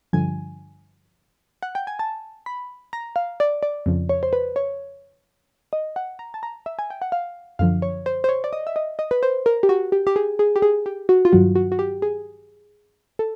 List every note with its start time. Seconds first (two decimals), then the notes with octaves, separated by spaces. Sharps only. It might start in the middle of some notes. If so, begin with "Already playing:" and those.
0.13 G2 D3 F3 G#5
1.63 F#5
1.75 G5
1.87 G#5
1.99 A5
2.46 B5
2.93 A#5
3.16 F5
3.40 D5
3.63 D5
3.86 F2 C#3 F3
4.09 C#5
4.23 C5
4.33 B4
4.56 C#5
5.73 D#5
5.96 F#5
6.19 A#5
6.34 A5
6.43 A#5
6.66 E5
6.79 G#5
6.90 G5
7.02 F#5
7.12 F5
7.59 F#2 D3 F3 F5
7.82 C#5
8.06 C5
8.24 C5
8.29 C#5
8.44 D5
8.53 D#5
8.67 E5
8.76 D#5
8.99 D#5
9.11 B4
9.23 C5
9.46 A#4
9.63 G4
9.69 F#4
9.92 G4
10.07 G4
10.16 G#4
10.39 G#4
10.56 G4
10.62 G#4
10.86 G4
11.09 F#4
11.25 F4
11.32 G2 D#3 F#3 F#4
11.55 F#4
11.72 F#4
11.79 G4
12.02 G#4
13.19 A4